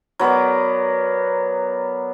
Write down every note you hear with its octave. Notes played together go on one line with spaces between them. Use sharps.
F#3 B3 A#4 D5